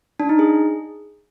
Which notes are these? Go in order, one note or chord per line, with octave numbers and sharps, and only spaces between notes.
D4
D#4
G#4